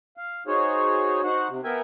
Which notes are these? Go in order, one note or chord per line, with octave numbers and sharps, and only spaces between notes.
F5
D#4 F#4 G#4 C5 C#5
D#4 F#4 C5 F#5
C3
B3 A#4 E5 G5 G#5